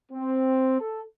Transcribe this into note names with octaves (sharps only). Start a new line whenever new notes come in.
C4
A4